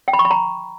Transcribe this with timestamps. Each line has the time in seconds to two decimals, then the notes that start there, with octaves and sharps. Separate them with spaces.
0.08 G5
0.13 B5
0.19 C#6
0.25 B5
0.31 A#5